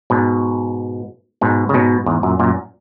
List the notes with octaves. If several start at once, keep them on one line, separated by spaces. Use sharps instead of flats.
G#2 B2
G#2 B2
C#3
G#2 B2
E2 G#2
F#2 A#2
F#2 A#2